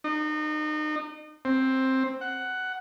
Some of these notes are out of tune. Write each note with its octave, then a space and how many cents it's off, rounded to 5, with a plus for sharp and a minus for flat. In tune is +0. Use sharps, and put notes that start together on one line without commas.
D#4 -35
C4 +10
F#5 +10